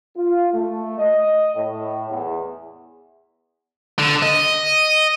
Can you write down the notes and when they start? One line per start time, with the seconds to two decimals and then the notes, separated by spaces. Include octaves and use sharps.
0.16 F4
0.53 A3
0.99 D#5
1.56 A2
2.10 E2
3.99 D3
4.22 D#5